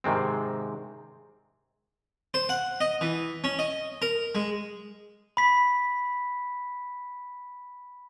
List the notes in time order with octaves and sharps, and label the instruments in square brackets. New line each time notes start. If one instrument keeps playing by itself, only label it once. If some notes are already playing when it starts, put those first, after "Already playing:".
[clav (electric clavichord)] G#2 C3 D#3 G#3 C4
[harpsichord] C5
F#5
D#5
E3
C#4
D#5
A#4
G#3
[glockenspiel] B5 B6